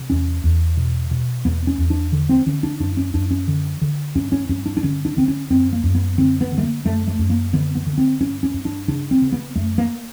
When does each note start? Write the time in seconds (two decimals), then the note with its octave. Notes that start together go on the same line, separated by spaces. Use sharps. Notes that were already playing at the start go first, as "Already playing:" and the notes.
Already playing: C3
0.10 E2 C#4
0.44 E2
0.77 B2
1.11 B2
1.45 E2 B3
1.67 C#4
1.78 E2
1.90 D4
2.12 D3
2.29 C4
2.46 D3 C#4
2.63 D4
2.80 F#2 D4
2.97 C#4
3.14 F#2 D4
3.31 C#4
3.48 D3
3.81 D3
4.15 G2 C#4
4.32 C#4
4.49 G2 C#4
4.66 D4
4.77 D4
4.83 D3 C#4
5.05 D4
5.17 D3 C4
5.28 C#4
5.50 F#2 C4
5.73 A#3
5.84 F#2
5.95 B3
6.18 D3 C4
6.41 B3
6.52 D3
6.58 A3
6.63 A#3
6.85 F#2 A3
7.08 A3
7.19 F#2
7.30 A#3
7.53 D3 B3
7.75 B3
7.87 D3
7.98 C4
8.20 G2 C#4
8.43 C#4
8.54 G2
8.65 D4
8.88 C#3 D4
9.11 C4
9.22 C#3
9.32 B3
9.55 F#2 A3
9.78 A#3